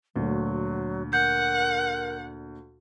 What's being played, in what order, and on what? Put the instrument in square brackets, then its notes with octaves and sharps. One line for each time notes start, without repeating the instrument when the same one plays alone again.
[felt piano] D2 A#2 [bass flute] F#3
[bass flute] A#4 [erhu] F#5 [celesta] G6